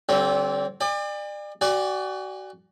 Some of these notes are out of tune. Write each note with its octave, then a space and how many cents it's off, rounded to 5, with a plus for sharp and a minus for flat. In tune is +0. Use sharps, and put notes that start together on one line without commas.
D3 -25 G3 -40 C4 +10
D5 +35 G#5 -45
F#4 +30 D5 +0 G#5 -30